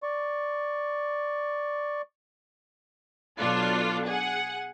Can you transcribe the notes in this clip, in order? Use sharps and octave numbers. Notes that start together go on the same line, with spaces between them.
D5 C#6
B2 F#3 D4 F4 A4
G#4 F#5